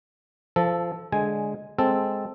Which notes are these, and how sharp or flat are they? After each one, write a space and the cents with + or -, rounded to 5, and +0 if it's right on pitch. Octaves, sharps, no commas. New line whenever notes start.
F3 -20 A4 +0
D3 +0 G#3 +5 G#5 +0
G#3 +0 C4 +0 A4 +0